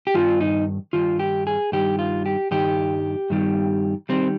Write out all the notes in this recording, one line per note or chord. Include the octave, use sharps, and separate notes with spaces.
G4
G2 D#3 F4
D#4
G2 D#3 F4
G4
G#4
G2 D#3 G3 G4
F4
G4
G2 D#3 G3 G4
G2 D#3 G3
D#3 G3 C4